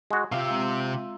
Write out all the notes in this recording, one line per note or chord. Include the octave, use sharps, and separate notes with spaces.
G#3 F#4
C3 F4 G4 E5 F5 E6
G#3 C4 A#5 C6